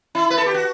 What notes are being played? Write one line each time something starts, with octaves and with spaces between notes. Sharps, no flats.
E4
B4
A4
G4
F#4